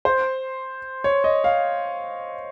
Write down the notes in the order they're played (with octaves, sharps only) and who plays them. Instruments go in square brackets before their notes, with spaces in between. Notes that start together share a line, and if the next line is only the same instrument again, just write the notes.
[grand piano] C5
C#5
D#5
F5